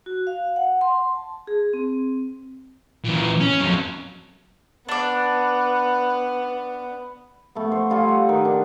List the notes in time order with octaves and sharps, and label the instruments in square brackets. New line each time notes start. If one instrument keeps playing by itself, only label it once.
[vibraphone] F#4
F5
F#5
C6
A5
G#4
C4
[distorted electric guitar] A#2 E3
C#4
F2 F#3
[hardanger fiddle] B3 [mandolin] D4 D5
[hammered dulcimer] A3 B3
C5 C#6
G3 F4 A4 G#5
F#5
D#3
D4